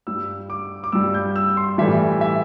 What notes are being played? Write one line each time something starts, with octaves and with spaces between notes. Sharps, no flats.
G2 G3 E6
D6
D6
G2 G3 E6
G6
E6
C6
A2 E3 G3 E5
E5